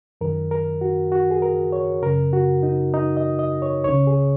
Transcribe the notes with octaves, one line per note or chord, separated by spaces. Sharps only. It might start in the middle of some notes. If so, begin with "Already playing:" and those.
F#2 D#3 A#4
A#4
F#4
F#4
G#4
A#4
C#5
F#2 C#3 A#4
F#4
D#4
D#4
D#5
D#5
C#5
C#2 C#3 C#5
G#4